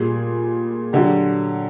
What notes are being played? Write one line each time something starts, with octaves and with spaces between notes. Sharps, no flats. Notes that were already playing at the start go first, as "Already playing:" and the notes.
Already playing: A#2 G3 G#4
D3 F#3 G4